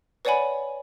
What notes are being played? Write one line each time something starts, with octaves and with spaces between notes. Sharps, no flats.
B4 C#5 D5 F#5 G#5 B5